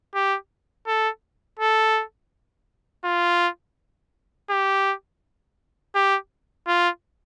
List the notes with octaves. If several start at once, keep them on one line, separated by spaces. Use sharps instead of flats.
G4
A4
A4
F4
G4
G4
F4